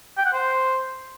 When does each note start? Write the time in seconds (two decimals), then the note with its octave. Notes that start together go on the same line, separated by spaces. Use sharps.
0.18 G5
0.26 F#5
0.33 C5